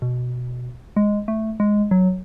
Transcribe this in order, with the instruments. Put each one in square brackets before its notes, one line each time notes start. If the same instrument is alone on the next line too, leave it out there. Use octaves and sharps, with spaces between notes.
[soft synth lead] B2
G#3
A3
G#3
F#3